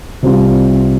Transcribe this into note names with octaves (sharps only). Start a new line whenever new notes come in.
C2 C3 G3 C4 F4